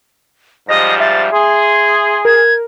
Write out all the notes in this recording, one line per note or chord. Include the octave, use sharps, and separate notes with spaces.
G#2 F3 G3 D#5 A#6
E5 A6
G#4 C6
A#4 G#6